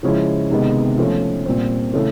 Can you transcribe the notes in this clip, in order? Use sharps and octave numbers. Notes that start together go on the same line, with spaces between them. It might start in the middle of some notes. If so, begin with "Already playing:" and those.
C#3 F3 G#3 C#4 E4
C3 D#3 G#3 B3 D#4
F3 A3 C#4
A#2 G3 C4
C#3 E3 A3